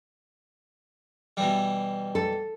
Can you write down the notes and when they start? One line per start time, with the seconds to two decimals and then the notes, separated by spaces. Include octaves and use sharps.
1.37 B2 E3 G3
2.15 A4